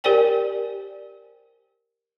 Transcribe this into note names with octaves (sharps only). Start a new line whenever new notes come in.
G4 A#4 C5 D5 G5 G#5